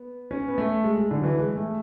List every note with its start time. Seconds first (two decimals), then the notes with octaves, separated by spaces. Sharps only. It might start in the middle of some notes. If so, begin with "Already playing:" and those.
Already playing: B3
0.31 C#4
0.48 B3
0.58 A3
0.84 G#3
0.97 G#3
1.11 D3
1.20 F#3
1.24 E3
1.37 G#3
1.55 A3